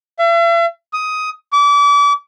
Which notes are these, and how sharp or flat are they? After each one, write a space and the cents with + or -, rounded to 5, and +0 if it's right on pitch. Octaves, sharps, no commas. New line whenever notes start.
E5 +45
D#6 +15
D6 -35